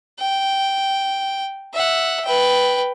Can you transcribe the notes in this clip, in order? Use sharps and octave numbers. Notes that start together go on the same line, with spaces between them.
G5
E5 F#5
B4 G5